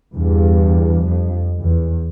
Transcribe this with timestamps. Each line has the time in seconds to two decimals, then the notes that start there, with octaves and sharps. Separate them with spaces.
0.14 E2 G2
1.03 F2
1.62 E2